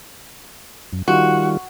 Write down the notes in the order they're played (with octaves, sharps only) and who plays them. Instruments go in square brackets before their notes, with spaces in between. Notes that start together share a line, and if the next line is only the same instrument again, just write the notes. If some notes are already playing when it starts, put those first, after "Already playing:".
[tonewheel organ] F#2
[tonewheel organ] D#3 G3 F4 [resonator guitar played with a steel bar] F#4